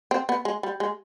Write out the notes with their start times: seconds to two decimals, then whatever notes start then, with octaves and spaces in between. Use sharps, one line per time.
0.11 C4
0.29 B3
0.45 G#3
0.63 G3
0.80 G#3